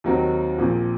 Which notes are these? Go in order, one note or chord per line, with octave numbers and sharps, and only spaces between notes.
D#2 D#3 F#3 C4 F#4
A#1 A#2 F3 C4